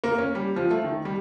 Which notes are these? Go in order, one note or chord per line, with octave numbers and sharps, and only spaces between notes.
A#3
C#4
G3
F3
A3
D#3
G3